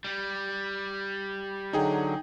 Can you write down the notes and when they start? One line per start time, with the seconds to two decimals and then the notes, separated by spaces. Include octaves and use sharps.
0.04 G3
1.73 D3 F#3 D#4 G#4 G5